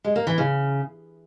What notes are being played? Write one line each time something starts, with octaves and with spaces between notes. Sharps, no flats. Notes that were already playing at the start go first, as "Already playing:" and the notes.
G#3
A#3
E3
C#3